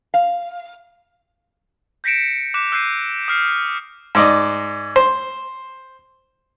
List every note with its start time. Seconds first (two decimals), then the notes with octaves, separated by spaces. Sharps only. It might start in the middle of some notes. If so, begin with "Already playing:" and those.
0.14 F5
2.04 G6 A#6 B6 C#7 D7 E7
2.54 D6 F#6 B6 E7
2.72 E6 F#6 G6 C7 D#7
3.28 D#6 F6 C7
4.15 G#2 D5 D#5
4.96 C5